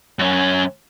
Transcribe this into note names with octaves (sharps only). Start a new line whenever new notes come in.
F#2 C#4